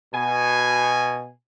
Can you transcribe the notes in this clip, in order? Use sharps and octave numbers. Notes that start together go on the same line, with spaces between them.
B2 G#5